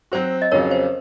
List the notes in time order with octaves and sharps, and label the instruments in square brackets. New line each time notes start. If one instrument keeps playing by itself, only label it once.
[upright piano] F#3 C4 F#4 [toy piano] C5
[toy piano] D#5
[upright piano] F2 C#3 F#3 C#4 [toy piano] A#4 C#5
[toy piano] C5